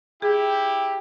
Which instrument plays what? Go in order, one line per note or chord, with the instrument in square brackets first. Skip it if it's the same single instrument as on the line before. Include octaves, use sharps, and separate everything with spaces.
[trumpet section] E4 G4 [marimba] G#4